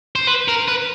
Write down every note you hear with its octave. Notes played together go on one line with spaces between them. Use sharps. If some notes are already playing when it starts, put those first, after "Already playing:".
C5
B4
A#4
B4